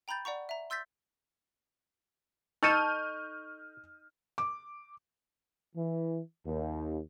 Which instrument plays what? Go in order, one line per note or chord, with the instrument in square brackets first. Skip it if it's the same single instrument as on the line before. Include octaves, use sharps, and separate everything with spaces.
[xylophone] G5 A#5 B5 G6 A6
D5 F#5 A#5 C#6
E5 A#5
C6 E6 G6 A6 B6
[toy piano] D#4 D#5 [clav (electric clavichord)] A4 [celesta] C#6 [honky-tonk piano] F6 G6 D#7
[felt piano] D6
[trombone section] E3
D#2